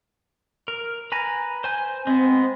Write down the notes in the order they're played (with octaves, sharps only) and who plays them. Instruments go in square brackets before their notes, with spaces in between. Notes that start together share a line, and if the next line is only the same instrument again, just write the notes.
[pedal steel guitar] A#4
B4 G#5 A#5
C5 G#5 G6
[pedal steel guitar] G#3 B3 [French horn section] C4